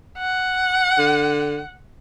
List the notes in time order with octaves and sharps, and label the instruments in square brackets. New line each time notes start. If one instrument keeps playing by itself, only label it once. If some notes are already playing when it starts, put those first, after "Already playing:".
[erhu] F#5
[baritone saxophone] D3